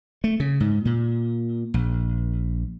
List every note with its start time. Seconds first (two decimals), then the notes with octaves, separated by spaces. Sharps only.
0.24 A3
0.40 C#3
0.60 G#2
0.85 A#2
1.74 A#1